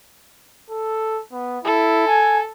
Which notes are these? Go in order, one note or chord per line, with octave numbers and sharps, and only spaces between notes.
A4
B3
E4 A4
G#5